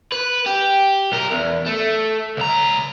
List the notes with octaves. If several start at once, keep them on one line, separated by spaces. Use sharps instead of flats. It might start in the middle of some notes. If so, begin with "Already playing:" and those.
B4
G4
B1 A#4
E2
A3
C#2 A#5